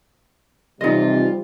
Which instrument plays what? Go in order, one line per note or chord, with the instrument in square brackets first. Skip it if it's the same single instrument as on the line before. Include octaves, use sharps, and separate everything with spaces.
[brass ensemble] C3 [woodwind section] E3 F4 [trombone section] F3 G3 [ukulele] D#4 D#5